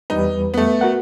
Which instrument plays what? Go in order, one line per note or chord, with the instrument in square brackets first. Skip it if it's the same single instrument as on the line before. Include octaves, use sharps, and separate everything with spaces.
[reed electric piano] E2 G3 B4 [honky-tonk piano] D#4
[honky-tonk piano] A3 B3
[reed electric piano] F#4 A#4 F#5